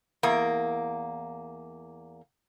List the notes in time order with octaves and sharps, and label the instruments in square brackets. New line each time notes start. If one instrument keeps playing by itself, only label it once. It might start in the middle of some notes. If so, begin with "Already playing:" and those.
[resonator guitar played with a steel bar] E2 A#3